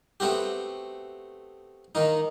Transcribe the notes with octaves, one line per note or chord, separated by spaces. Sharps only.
A3 B3 C4 F#4 G4
D#3 A#3 D#4